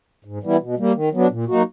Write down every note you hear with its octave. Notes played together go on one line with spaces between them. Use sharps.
G#2
E3 G3 B3 E4
B2
G3 A#3
D#3
F#3 B3 D4
A#2
F#3 A#3 D#4 F#4